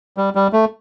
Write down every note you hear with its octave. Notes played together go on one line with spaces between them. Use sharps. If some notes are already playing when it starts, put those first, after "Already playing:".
G3
G3
A3